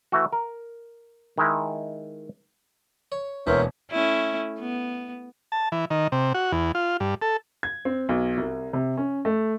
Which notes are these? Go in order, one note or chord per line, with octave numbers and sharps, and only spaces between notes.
E3 A3 F#4
A#4
D#3 G#3 E4
C#5
E1 E3 A#3 B3 A#4 C5 C#5 E5
A3 C#4 E4
B3
A5
E3
D#3
C3
F#4
E2
F4
G2
A4
G#6
C4
B1
C2
C3
C#4
A3